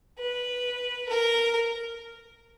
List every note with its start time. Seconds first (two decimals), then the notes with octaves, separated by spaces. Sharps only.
0.19 B4
1.09 A#4